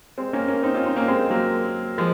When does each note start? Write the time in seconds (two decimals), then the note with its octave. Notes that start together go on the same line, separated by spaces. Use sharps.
0.18 G#3 C4
0.33 A#3 C#4
0.48 A#3 C#4
0.63 C4 D#4
0.74 C#4 F4
0.85 C4 D#4
0.96 A#3 C#4
1.08 G#3 C4
1.30 F#3 A#3
1.98 F3 G#3